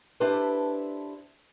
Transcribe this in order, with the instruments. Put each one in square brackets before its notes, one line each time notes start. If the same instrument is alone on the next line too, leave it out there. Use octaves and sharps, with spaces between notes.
[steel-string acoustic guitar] D4 E4 G4 A4 B4 C5